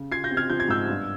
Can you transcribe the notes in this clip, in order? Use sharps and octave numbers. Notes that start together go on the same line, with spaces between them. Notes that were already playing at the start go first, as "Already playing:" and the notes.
Already playing: C#3
F4 G#6 C7
G6 A#6
C4
F6 G#6
F3 G6
G#6
G#2 E6 G6
G2